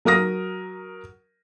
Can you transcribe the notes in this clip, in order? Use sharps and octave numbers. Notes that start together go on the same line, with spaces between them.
F#3 A#4 D#6 A#6